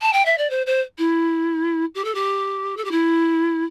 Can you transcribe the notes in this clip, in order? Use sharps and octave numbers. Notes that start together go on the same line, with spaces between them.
A5
G5
E5
D5
C5
C5
E4
G4
A4
G4
A4
G4
E4